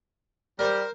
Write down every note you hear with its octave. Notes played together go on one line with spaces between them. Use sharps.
G3 A#4 C5